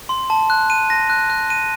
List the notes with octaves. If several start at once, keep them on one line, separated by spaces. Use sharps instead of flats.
C6
A5
F#6
D#7
A#6
F#6
F#6
D#7